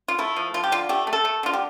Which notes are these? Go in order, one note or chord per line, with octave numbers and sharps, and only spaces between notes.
F4
A3 E4
F3
F3 F4
G4
D3 F4
A3 G4
A3
A4
A3
D3 F4
G4